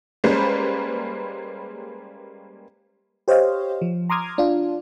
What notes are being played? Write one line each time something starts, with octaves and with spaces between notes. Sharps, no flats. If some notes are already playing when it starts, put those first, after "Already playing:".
G3 G#3 A#3 C#4 B4 C5
G4 C5 C#5 D#5 F5
F3
A#5 C6 D6 D#6 F6 G#6
D4 F4